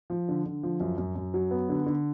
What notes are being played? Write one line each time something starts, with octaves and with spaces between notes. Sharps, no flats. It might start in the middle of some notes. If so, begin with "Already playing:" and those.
F3
D3
D3
F3
F#2
F#2
F#2
F#3
B3
D3
D3